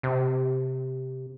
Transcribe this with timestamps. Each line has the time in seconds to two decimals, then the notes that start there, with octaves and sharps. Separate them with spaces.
0.03 C3